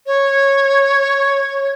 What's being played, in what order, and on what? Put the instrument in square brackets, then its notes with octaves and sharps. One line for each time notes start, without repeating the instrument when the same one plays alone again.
[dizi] C#5